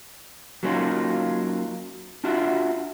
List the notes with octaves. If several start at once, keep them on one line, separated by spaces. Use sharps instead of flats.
F#3 A#3 C#4 D#4 F4
D4 F4 F#4 E5